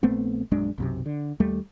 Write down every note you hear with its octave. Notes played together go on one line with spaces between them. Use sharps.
A#1 A3 B3 C4
A#1 F#2 G#3 D4
B1 F#2 C3
D3
D#2 G3 A3